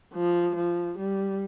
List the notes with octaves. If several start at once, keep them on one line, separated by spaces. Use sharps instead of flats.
F3
F3
G3